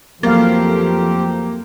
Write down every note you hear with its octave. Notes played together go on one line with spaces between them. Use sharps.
F2 F3 F#3 A3 A#3 C4 G4 F5